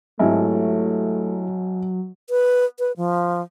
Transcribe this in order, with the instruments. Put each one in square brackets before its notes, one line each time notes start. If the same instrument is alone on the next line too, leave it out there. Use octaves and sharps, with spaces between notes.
[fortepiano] G#1 [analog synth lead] F#3 [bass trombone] A3 [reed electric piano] E4 G4 E5
[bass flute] B4
B4
F3